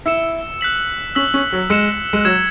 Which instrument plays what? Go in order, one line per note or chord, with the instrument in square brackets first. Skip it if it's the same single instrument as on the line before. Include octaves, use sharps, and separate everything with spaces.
[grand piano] E4 [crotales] E6 C#7 E7
[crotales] F#6 B6 F#7
[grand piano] C#4 [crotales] E6 B6 F#7
[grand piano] C#4
F#3
[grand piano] G#3 [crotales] E6 C#7 E7
[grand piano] G#3
[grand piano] F#3 [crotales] E6 G#6 E7